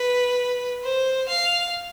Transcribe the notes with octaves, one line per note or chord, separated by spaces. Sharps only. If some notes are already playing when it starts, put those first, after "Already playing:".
Already playing: B4
C5
F5